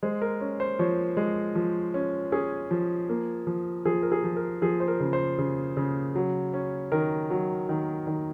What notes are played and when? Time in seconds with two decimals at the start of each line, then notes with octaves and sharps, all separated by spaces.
0.03 G#3 C5
0.22 A#4
0.41 C#4
0.60 C5
0.79 F3 C#5
1.17 G#3
1.55 F3
1.94 C#4
2.32 C#4 G#4
2.71 F3
3.09 A#3
3.47 F3
3.85 F3 G#4
4.03 A#4
4.12 G#4
4.24 F3
4.36 A#4
4.62 F3 G#4
4.80 C5
4.88 A#4
5.00 C#3
5.13 C5
5.38 C#3
5.77 C#3
6.15 F#3
6.54 C#4
6.92 D#3 A#4
7.30 F#3
7.69 D#3
8.07 D#3